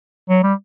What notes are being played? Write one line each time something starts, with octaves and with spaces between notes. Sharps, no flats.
F#3
G3